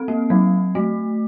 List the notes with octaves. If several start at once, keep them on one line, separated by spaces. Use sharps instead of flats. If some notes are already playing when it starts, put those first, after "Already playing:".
Already playing: C4
A#3
F#3
A3